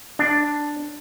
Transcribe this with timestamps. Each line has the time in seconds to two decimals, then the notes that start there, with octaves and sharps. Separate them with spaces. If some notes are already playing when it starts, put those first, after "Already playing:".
0.19 D4